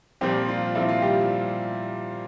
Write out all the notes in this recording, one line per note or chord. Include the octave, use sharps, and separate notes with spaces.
A#2 F3 G3 C4 G4
F4
A#2 F3 C4 E4
F4
G3 G4